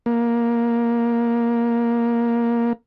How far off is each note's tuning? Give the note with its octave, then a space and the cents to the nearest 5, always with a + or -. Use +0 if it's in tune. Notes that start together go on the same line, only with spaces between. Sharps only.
A#3 +10